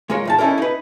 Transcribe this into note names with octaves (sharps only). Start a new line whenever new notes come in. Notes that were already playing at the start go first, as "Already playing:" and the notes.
G#3 F4 A#4 C#5
E2 A#2 A5
C#4 D#4 E4 A4 A#4
D#4 B4